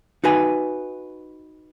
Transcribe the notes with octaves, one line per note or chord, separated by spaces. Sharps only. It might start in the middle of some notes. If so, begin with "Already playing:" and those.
D#4 F#4 B4 G#5